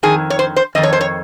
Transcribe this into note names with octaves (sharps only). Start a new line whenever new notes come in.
F2 D#3 G#4
C#5
C5
C5
F2 D#3 D#5
C#5
C5
C#5